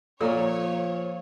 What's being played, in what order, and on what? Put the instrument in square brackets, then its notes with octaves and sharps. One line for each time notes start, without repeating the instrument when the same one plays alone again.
[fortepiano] A#2 [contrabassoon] F3 [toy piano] A4 A#5 C#6 [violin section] C#5